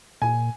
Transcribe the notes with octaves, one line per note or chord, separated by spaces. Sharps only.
A#2 G#5